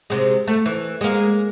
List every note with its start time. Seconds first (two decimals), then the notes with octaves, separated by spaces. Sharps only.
0.10 C3 G#3
0.47 A3
0.66 E3
1.01 G#3 A#3